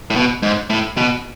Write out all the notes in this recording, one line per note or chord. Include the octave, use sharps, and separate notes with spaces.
A2
B2
G#2
A2
B2